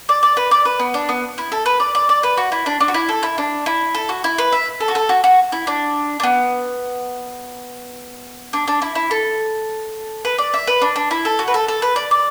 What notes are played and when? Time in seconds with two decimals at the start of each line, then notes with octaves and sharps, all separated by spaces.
0.09 D5
0.23 D5
0.37 B4
0.51 D5
0.65 B4
0.80 B3
0.94 D4
1.09 B3
1.38 E4
1.52 A4
1.66 B4
1.80 D5
1.95 D5
2.09 D5
2.23 B4
2.37 F#4
2.52 E4
2.66 D4
2.80 D4
2.88 F#4
2.94 E4
3.09 A4
3.23 E4
3.38 D4
3.66 E4
3.95 A4
4.09 F#4
4.24 E4
4.38 B4
4.52 E5
4.80 A4
4.88 F#4
4.95 A4
5.09 F#4
5.24 F#4
5.52 E4
5.67 D4
6.20 D4
6.23 B3
8.53 D4
8.68 D4
8.82 E4
8.95 E4
9.11 A4
10.25 B4
10.38 D5
10.54 E5
10.67 B4
10.82 D4
10.96 D4
11.11 E4
11.25 A4
11.39 F#4
11.48 B4
11.54 A4
11.68 A4
11.82 B4
11.96 D5
12.11 D5